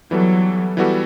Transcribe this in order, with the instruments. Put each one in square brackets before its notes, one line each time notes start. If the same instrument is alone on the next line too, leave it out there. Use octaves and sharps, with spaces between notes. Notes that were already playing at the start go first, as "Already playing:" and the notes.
[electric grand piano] E3 G3 B3 F#4 A4 [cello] F#3
[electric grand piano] E3 G3 B3 F#4 A4